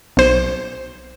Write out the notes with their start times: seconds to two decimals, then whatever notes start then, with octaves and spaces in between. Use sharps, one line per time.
0.17 B1 C5